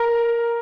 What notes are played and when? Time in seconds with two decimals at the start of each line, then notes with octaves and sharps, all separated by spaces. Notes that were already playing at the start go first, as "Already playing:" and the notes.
Already playing: A#4